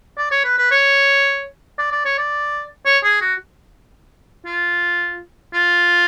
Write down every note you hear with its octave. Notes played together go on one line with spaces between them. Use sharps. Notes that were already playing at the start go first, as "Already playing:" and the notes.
D5
C#5
B4
B4
C#5
D5
D5
C#5
D5
C#5
G#4
F#4
F4
F4